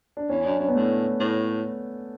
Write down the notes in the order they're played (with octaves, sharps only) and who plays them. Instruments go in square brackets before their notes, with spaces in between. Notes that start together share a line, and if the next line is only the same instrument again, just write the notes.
[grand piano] D4
[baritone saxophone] E2 [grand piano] C#4
[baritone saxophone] F#2 [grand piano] D4
[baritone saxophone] F#2 [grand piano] C#4
[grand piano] B3
[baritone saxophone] A2 [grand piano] A3
[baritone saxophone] A2